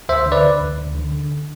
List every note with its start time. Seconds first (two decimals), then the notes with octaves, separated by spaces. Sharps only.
0.09 D2 C5 E5
0.26 D3
0.32 B4 D5
0.43 D3
0.61 D2
0.78 D2
0.95 D3
1.12 D3